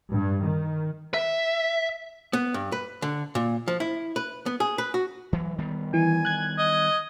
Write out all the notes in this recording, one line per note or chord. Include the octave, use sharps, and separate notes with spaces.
G2
D#3
E5
B3
G2
B4
D3
A#2
F3
E4
B4
B3
G#4
B4
F#4
E3 F#3
D#3 G3 B3
E3 G#5
F#6 G#6
D#5